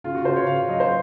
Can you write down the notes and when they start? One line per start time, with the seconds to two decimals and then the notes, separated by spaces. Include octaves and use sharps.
0.04 C#3 F4
0.15 F#4
0.25 C#3 C5
0.36 C#5
0.47 C#3 F5
0.58 F5
0.69 F#3 D#5
0.80 C5